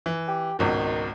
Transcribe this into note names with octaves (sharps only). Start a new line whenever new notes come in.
E3
G4
G#1 C#2 B2 D#3